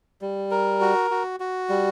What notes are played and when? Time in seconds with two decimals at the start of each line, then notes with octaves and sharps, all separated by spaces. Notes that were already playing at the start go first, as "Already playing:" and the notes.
0.21 G3
0.51 A#4
0.81 F#4
1.11 F#4
1.40 F#4
1.69 G3